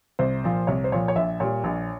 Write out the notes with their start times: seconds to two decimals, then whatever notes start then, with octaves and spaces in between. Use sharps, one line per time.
0.19 C2 C5
0.44 A#2 F3
0.67 C2 C#5
0.84 C5
0.92 A#2 F3 C#5
1.08 C#5
1.16 A#1 E5
1.40 A#2 G3 C#5
1.64 A#1